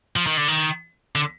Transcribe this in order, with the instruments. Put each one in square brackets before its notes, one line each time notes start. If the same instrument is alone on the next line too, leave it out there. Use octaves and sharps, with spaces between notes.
[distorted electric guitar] F3
D#3
D3
D#3
D3